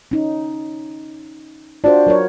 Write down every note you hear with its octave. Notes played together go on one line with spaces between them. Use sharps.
C#4 D#4
D4 F4 F#4 C5
F#3 A#4 C#5